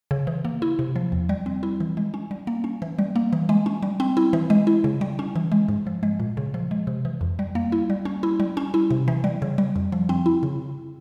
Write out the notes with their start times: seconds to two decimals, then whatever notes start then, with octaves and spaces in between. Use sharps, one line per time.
0.11 C#3
0.27 E3
0.45 A#3
0.62 E4
0.79 C3
0.96 F3
1.12 E2
1.29 G3
1.46 C4
1.63 E4
1.80 E3
1.97 G#3
2.14 C#4
2.31 G3
2.47 A#3
2.64 C#4
2.82 E3
2.99 G3
3.16 A#3
3.33 E3
3.49 G#3
3.66 C#4
3.83 G3
4.00 C4
4.17 E4
4.33 E3
4.50 G#3
4.67 E4
4.84 C#3
5.01 G3
5.19 C#4
5.36 E3
5.52 G#3
5.69 G#2
5.87 F3
6.03 G#3
6.20 A#2
6.37 C#3
6.54 F3
6.71 G#3
6.87 C3
7.05 E3
7.21 F2
7.39 G3
7.55 A#3
7.72 E4
7.90 G3
8.05 C#4
8.23 E4
8.40 G3
8.57 C#4
8.74 E4
8.91 C3
9.08 E3
9.24 G3
9.42 C#3
9.58 G3
9.76 F2
9.92 F3
10.09 C4
10.26 E4
10.43 C#3